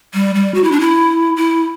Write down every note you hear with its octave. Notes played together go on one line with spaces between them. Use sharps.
G3
G3
F#4
E4
D4
E4
E4